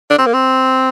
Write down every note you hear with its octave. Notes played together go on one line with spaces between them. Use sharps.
D4
C4
A#3
C4